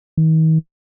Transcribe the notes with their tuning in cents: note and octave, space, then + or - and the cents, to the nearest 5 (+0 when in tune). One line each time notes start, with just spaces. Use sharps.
D#3 +40